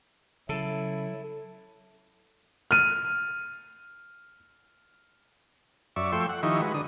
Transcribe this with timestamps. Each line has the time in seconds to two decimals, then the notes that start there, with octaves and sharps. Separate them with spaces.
0.49 C#3 F#3 E4 A4
2.71 F6 D#7
5.96 F#2 D5 E5 C#6
6.12 F3 A3 G5 C6 C#6 E6
6.29 F#5
6.43 D#3 F3 D#4 E4 G4 C#6
6.61 G#3 F#4 B4
6.74 D3 D#6